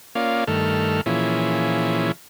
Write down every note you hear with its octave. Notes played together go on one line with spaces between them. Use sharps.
A#3 C#4 F4 D5 F5
G2 D#3 A3 A4 F6
A#2 E3 F3 C#4 E4 G#4